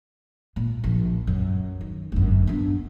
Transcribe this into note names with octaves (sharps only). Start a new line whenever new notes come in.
A#2
A#1
F#2
D#3
G1 F#2
B3 D4